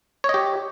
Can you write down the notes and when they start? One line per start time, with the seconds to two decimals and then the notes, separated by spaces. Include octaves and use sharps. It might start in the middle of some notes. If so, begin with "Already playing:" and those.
0.24 C#5
0.29 D#5
0.34 G4